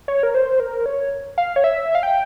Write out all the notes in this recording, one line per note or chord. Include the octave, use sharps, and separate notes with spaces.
C#5
A#4
C5
A#4
C#5
F5
C#5
E5
F5
G5